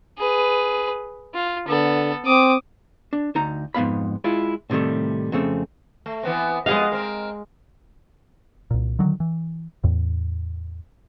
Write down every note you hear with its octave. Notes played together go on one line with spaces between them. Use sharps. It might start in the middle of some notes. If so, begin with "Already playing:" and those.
G#4 B4
F4
D3 B3 A4
C4 D6 D#6
D4
D2 D#4 A#5
F2 G#2 B3 F5 B5
G#3 E4 F4
A2 C3 D#3 G3 A3
F2 C#3 A3 C4
A3
E3 B3 C4
F2 G#3 B3 G#4 D#5 F5
C4 A#4
C2 A#2
D3 D#3 F#3
E3
E2 A2